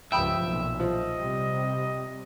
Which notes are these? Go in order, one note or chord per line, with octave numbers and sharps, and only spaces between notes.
C#2 G2 F3 E5 G5 B5 D#6
B1 A#2
F3 D#5
C3 G3